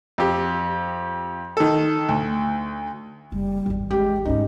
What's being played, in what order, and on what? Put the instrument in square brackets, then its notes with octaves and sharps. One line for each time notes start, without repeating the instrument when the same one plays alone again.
[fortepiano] F2 G4
D#3 A4
D2
[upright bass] F#1 [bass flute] G3
[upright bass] G#1 E2
[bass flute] G#3 [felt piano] G4
[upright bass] D2 G#2 [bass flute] C#4 [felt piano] D#4